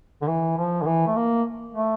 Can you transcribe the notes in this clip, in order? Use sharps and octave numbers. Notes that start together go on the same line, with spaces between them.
D3
E3
F3
D3
E3
A3
A#3
A3